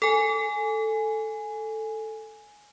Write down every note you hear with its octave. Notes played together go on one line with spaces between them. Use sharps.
A4 G#5